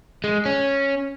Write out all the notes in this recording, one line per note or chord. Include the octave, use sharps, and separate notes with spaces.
G#3
C#4